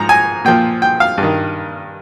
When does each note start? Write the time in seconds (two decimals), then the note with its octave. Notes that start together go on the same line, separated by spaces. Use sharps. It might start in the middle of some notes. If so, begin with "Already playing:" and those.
Already playing: G#2 F3 A#5
0.09 G#5
0.45 A#2 F3 G5
0.82 G5
1.00 F5
1.18 G2
1.23 D#3